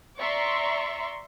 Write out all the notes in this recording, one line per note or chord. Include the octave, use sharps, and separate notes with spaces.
D5 E5 A#5 C6 C#6